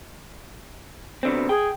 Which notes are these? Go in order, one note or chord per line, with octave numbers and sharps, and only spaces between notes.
B2 D3 C4
G#4 G5